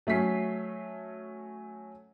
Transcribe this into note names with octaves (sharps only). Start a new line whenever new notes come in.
F#3 A3 C#4 B6 C7